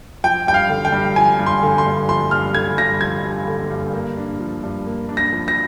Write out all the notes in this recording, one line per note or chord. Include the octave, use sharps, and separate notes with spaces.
F3 G5
G2 G5
F5
D3
G5
G2
F3 G#5
G2
C6
D3
C6
G2
F3 C6
G2 F6
D3 G#6
G2 A#6
F3 G#6
G2
D3
G2
A#3
D4
F3
G2
A#3
D4
A#6
F3
A#6